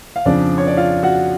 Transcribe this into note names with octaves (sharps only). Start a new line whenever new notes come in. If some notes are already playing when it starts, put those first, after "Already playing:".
F5
F2 C#3 F3 D4 D5
C#5
D5
F4 F5
F#4 F#5